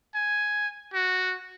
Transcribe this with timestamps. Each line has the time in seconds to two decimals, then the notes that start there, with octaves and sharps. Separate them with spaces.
0.15 G#5
0.94 F#4